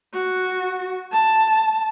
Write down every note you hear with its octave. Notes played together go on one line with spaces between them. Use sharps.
F#4
A5